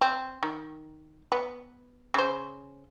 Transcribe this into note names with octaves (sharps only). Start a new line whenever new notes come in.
C4
D#3
B3
C#3 C5